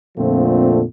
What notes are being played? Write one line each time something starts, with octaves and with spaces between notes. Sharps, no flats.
F2 A#2 D3 F3 A3 C4